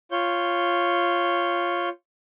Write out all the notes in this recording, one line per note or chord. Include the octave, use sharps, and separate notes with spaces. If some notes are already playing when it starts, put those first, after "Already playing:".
F4 C#5 G6